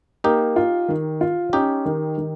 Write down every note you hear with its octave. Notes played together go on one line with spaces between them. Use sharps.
A#3 D#4 G4
F4
D#3
F4
C#4 D#4 G4
D#3
D#3